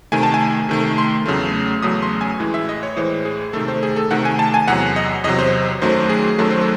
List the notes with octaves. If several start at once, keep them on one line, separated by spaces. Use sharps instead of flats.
C3 D#3 A3 G#5
A5
G#5
C3 D#3 A3
C6
E2 C#3 F#3 A3
E2 C#3 F#3 A3 D#6
C6
G#5
A2 E3 G#3
E5
D#5
C#5
A2 E3 G#3 C5
G#4
C3 D#3 A3 A4
C5
G#4
A4
C3 D#3 A3 F#5
G#5
A5
G#5
E2 C3 F#3 F#5
D#5
E2 C3 F#3 D#5
C5
F#2 D#3 F#3 A3 C5
G#4
F#2 D#3 F#3 A3 A4
C5
A4